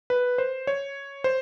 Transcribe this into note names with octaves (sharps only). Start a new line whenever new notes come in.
B4
C5
C#5
C5